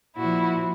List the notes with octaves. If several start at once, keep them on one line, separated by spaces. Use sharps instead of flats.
A#2 F3 E4 F#4